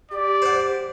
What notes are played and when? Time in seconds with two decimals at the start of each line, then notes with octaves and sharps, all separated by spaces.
0.11 G4 D5
0.42 C5 F#5